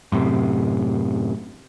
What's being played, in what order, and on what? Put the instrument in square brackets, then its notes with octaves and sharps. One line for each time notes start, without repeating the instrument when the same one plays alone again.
[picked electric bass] F#2 A2 C3